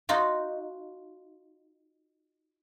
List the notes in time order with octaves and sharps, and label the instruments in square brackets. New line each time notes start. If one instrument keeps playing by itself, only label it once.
[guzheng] D#4 F4 F#4